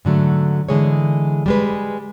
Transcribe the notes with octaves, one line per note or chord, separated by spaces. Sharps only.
G#2 D3 F#3 A3
D3 E3 G#3 G#4 C#5
G3 G#3 B4